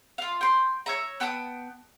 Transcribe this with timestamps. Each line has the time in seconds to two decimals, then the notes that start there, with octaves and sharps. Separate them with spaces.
0.18 F4 F5
0.41 G5 C6
0.86 C#5 E5 A#5
1.20 B3 G5 A5 D#6